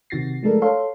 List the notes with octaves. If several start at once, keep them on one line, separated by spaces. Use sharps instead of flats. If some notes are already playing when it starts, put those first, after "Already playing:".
C3 D#3 F#4 A6 A#6 C7
F3 G#3 A3 D4 A4 A#4
A4 C#5 F5 C6